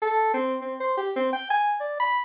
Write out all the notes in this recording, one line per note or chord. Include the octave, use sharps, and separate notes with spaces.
A4
C4
C4
C5
G4
C4
G5
G#5
D5
B5